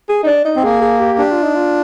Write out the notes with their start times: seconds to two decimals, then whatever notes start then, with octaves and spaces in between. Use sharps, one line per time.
0.09 G#4
0.23 D#4
0.27 D4
0.45 D#4
0.56 C4
0.63 A#3 G#4
0.82 G#4
1.00 G4
1.18 D4 G4
1.31 F4
1.43 D#4
1.55 F4